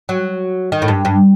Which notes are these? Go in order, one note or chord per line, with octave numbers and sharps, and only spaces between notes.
F#3
D#3
A2
G2
G2